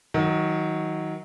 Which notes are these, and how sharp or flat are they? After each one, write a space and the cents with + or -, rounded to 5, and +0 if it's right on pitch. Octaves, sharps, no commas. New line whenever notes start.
D#3 +25 F#3 +0